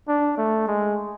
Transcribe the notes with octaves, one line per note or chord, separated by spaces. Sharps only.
D4
A3
G#3